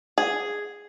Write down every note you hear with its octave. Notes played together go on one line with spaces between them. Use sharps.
G#4